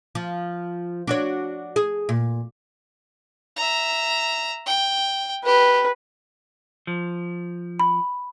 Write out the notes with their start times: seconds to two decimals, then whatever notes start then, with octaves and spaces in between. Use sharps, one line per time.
0.15 F3
1.07 D4 F#4 C#5
1.76 G#4
2.09 A#2
3.56 E5 A#5
4.66 G5
5.45 G4 B4
6.87 F3
7.80 B5